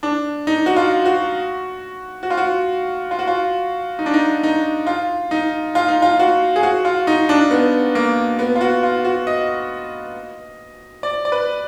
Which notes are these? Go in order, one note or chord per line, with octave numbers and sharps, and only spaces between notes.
D4
D#4
F#4
F4
F#4
F#4
F4
F#4
F4
F#4
F4
D#4
D4
D#4
D#4
F4
D#4
F4
D#4
F4
F#4
G#4
F#4
F4
D#4
D4
B3
A#3
B3
F4
F#4
F4
F#4
D#5
D5
D5
B4